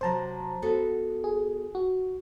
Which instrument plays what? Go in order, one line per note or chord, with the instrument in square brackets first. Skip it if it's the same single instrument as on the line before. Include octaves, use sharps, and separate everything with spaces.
[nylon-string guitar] C3 F#3 [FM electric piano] C5 A5 A#5
[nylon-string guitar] B3 F#4 A4
[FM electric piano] G#4
F#4